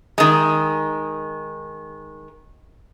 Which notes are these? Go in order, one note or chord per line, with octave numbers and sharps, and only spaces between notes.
D#3 G#3